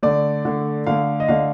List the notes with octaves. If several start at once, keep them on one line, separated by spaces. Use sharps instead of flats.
D3 A3 D5
D3 A3
D3 A3 F5
D#5
D3 A3 F5